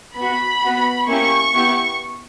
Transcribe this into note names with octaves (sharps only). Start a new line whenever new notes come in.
B3 F#4 B5
B3 F#4
A#3 C#4 E4 G4 C#6
B3 E4 G4